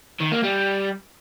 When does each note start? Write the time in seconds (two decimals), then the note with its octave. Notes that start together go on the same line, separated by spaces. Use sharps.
0.21 D#3
0.32 A#3
0.43 G3